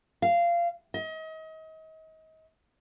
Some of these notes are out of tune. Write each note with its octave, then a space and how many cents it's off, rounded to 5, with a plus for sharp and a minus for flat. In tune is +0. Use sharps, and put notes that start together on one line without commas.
F5 -20
D#5 +35